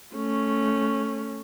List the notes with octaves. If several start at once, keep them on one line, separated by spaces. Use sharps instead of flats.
A3 C#4